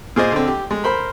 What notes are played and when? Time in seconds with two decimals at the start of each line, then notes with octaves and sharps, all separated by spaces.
0.16 A#2 G#4 C5 D#5
0.32 D3 C4
0.48 G4
0.71 G#3
0.84 A#4 C5 B5